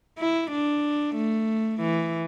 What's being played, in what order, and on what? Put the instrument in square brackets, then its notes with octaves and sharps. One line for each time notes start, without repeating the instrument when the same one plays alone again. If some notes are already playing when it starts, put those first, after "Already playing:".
[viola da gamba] E4
D4
A3
E3